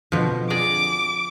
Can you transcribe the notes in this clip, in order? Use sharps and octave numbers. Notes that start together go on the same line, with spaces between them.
F2 B2 D3 F3
G#4 D5 A#5 D6